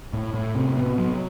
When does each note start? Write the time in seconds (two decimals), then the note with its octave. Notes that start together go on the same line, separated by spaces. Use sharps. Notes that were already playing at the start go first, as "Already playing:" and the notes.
0.13 A2
0.34 A2
0.55 C3
0.77 B3
0.98 F#3